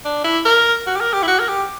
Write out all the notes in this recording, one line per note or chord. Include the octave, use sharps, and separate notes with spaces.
D4
E4
A#4
F#4
G4
A#4
G4
E4
F#4
A#4
G4